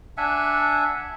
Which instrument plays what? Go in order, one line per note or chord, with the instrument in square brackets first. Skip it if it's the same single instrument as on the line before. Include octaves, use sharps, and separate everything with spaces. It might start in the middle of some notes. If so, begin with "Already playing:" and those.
[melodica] D4 E5 F#5 G#5